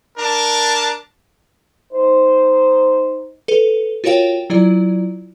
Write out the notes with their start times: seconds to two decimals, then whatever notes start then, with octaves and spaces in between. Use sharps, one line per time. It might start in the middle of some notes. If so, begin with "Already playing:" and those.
0.18 D4 A#4 A5
1.93 D#4 C5
3.48 A4 B4
4.04 F4 F#4 A#4 C#5 F5 G5
4.50 F#3 E4 F4 D5